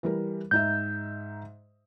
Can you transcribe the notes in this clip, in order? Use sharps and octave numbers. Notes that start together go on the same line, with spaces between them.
E3 G3 A#4
G#2 D#4 E5 G6